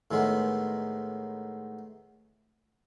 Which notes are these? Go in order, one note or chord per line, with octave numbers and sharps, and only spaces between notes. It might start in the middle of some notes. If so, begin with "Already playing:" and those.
A2 D#3 G#3 B3